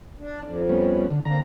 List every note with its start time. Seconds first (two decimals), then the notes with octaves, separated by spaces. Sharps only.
0.19 D4
0.43 F2 D4
0.69 G3 B3 C#4
1.10 D3
1.25 D3 A#3 C4 A#5